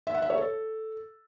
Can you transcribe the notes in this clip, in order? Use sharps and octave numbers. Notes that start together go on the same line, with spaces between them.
E5
F#5
E5
C#5
A4